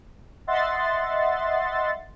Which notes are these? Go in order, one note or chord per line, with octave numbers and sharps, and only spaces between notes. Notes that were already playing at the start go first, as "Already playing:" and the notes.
D#5 E5 F#5 C6 A6